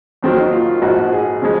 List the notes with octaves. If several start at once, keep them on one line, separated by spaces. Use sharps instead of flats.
F2 D#3 F#3 A#3 C4
D#4
F4
A#1 G#2 F3 F#4
G#4
C#3 F3 G#3